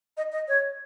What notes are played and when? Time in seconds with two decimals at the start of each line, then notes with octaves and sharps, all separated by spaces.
0.17 D#5
0.32 D#5
0.48 C#5